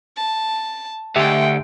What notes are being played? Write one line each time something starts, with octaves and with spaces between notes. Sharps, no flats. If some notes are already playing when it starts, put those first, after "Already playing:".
A5
D2 G#3 G4 E5 G5